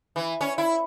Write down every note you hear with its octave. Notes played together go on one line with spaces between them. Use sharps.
E3
C#4
E4